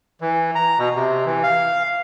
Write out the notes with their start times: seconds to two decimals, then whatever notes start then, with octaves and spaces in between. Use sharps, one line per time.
0.21 E3
0.55 A#5
0.79 B2
0.95 C3
1.26 E3
1.43 F5